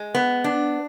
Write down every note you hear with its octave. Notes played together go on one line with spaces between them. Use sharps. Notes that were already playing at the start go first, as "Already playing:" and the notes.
Already playing: G#3
B3
D4